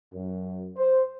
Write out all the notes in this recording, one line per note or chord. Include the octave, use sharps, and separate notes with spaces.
F#2
C5